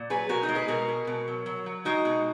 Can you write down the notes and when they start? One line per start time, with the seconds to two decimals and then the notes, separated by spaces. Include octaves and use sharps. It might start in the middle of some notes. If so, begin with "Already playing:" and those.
Already playing: A#2
0.10 F#3 G#4 B4
0.29 B2 F#4 A#4
0.43 D#4 F#4
0.49 G#3
0.55 G#4 B4
0.68 B2 F#4 A#4
0.88 G#3
1.07 B2
1.28 F#3
1.46 F#3
1.66 F#3
1.85 G#3 D#4 F#4
2.05 B2